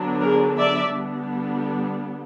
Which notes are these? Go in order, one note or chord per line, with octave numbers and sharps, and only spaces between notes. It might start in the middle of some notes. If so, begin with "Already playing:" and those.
Already playing: D3 F#3 B3 D4
G#4 A#4
D5 E5
D3 G3 B3 D4